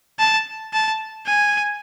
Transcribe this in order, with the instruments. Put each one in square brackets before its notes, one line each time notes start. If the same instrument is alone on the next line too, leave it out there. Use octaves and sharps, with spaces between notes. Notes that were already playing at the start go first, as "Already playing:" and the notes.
[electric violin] A5
A5
G#5